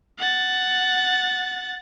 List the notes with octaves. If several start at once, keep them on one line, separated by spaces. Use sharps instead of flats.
F#5 A6